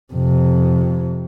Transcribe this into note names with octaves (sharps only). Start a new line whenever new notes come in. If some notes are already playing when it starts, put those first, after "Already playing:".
F2 C3